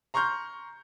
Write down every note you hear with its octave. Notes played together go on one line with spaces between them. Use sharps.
A#5 C6 C#6 F6 G6